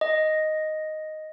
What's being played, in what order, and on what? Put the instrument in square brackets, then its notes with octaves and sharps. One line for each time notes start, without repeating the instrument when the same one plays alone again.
[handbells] D#5